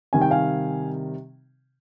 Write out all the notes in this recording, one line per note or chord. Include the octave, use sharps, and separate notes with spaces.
C3 D#3 G3 G#5
G5
F5 G#5